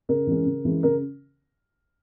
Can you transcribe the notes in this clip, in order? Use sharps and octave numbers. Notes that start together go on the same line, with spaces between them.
C#3 A#4
E3 G#3 C#4
C#3
E3 G#3 C#4
C#3 A#4